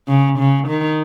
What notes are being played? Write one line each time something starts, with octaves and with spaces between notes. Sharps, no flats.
C#3
C#3
D#3